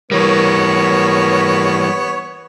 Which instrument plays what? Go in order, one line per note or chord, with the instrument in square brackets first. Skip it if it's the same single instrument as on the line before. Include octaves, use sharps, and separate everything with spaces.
[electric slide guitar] E3 G3 [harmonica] B3 [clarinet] A#4 [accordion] C#5